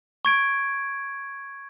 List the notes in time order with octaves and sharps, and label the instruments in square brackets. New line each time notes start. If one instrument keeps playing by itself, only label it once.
[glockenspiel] C#6 G#6 D7